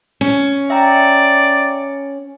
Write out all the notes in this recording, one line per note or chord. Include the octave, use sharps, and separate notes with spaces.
C#4
D5 E5 G5 A#5